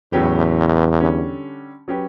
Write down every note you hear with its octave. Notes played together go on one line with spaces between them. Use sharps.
E2 A2 F#3 C#4 G4 B4
D3 G3 C#4
F#3 C#4 G4 B4